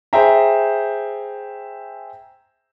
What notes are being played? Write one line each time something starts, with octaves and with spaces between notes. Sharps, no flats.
G#4 C5 E5 G5 A#5